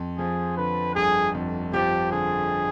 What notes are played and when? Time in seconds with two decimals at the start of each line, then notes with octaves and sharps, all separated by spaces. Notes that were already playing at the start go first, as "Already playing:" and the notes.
Already playing: F2
0.18 F3 G#4
0.57 D3 B4
0.95 G1 G#4
1.35 F2
1.73 F3 G4
2.12 D3 G#4